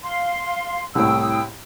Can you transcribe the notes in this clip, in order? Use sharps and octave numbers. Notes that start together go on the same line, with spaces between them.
F5 C6
C2 A2 G5 D#6 E6